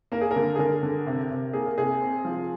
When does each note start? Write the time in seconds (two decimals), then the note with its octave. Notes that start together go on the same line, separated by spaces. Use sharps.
0.12 A#3 A#4
0.21 G#4
0.31 A#4
0.36 D3
0.55 G#4
0.59 D3 A#4
0.83 D3
1.07 C3
1.31 C3
1.53 A#3 G#4
1.66 A#4
1.78 C3 G#4
2.01 C4
2.25 F3